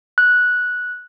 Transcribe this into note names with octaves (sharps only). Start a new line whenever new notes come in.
F#6